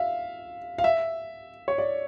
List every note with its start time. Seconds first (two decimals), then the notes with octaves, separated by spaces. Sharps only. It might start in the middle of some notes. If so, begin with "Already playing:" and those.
Already playing: E5 F5
0.78 F5
0.84 E5
1.68 C#5
1.78 D5